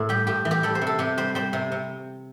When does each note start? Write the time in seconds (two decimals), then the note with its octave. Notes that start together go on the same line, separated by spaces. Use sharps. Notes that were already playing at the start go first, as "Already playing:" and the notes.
Already playing: A2 E4
0.09 G3 G4
0.27 A2 G4
0.45 E3
0.51 G4
0.63 G3 A4
0.75 C5
0.82 C3
0.87 A4
0.99 C3 G4
1.18 G3 C5
1.35 G3 C5
1.53 C3
1.72 C3